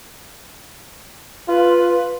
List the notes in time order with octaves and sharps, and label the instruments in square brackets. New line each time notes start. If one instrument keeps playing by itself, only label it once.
[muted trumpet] F4 [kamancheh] B4